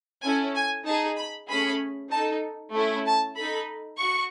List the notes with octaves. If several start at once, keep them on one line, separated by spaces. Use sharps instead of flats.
C#4 E4 A4 G#5
G#5
D#4 G#4 A5
B5
A3 C#4 G#4 B5
D#4 A4 A5
A3 C#4 E4
A5
D#4 A4 B5
F#4 C#6